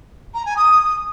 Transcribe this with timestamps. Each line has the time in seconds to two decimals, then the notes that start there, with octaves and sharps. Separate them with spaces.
0.34 A#5
0.45 G#5
0.56 D#6